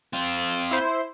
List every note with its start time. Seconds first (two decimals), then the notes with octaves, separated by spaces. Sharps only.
0.13 C4 F4
0.71 E4 C5